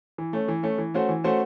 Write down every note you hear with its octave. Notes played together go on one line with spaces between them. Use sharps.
E3
A3 C#4
E3
A3 C#4
E3
A3 C#4 F#4 C5
E3
A3 C#4 F#4 C5